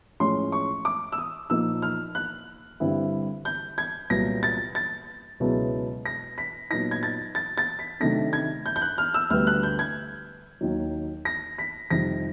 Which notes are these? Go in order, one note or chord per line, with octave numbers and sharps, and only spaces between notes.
A2 F3 G#3 C#4 C6
C#6
D6
E6
D#6
A#2 F3 A#3 D#4 E6
F6
F#6
G2 D3 G3 C4 E4
G6
G#6
C2 A#2 F#3 B3 A#6
A6
A6
C#2 B2 F#3 B3 E4
A#6
B6
A#2 F#3 B3 D#4 A#6
G#6
A6
A6
A6
B6
C3 D#3 F#3 A3 D4 A#6
G#6
G6
G6
F#6
F6
E6
D2 D3 G3 B3 F6
F#6
G6
G#6
D#2 D#3 F#3
A#6
B6
F2 C3 D#3 G3 A#6